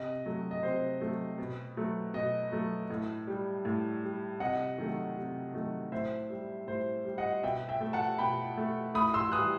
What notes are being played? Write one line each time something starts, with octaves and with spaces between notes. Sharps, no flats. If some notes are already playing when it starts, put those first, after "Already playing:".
Already playing: C3 D#5
F#3 A3
D#5
C3 C5
F#3 A3
B2
F#3 A3
B2 D#5
F#3 A3
A2
G3
A2
G3
C3 D#5 F#5
D#3 F#3 A3
C3
D#3 F#3 A3
A2 C5 E5
G3
A2 C5
G3
D#5 F#5
B2 E5 G5
E5 G5
A3
F#5 A5
B2 G5 B5
A3
A2 B5 D#6
C6 E6
E3 G3 D#6 F#6